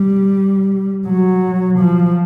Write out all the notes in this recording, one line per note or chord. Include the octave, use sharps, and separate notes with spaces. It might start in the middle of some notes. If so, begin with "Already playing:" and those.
Already playing: G3
F#3
F3